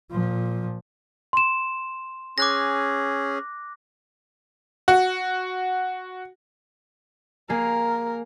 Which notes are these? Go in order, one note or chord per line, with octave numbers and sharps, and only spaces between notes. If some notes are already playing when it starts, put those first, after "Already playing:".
A#2 F3
C6 E7
C#4 G#4 D6 F#6 A#6
F#4
A#3 G#4 A#4